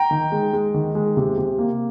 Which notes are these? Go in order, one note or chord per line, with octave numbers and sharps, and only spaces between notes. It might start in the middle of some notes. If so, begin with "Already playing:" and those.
Already playing: G5 A#5
D#3
G#3
G#3
D#3
G#3
C3
C3
A#3